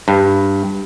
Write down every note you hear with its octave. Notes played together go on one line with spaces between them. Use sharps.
G2